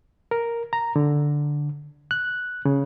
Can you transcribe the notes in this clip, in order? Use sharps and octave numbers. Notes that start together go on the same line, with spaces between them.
A#4
A#5
D3
F#6
C#3